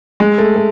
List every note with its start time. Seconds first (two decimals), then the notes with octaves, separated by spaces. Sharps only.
0.20 G#3
0.38 A3
0.56 A3